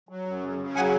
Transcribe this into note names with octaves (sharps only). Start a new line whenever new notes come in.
F#3
F#2
C#3
C#3
F#3 F#5 G#5